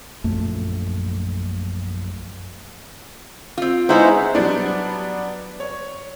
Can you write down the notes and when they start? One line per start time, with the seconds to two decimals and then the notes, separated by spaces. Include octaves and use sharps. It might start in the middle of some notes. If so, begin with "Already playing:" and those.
0.24 A#1 F#2 A3
3.58 C4 F4
3.89 G#3 B3 D#4 E4 C5 C#5
4.35 F#3 G3 B3 D4
5.60 C#5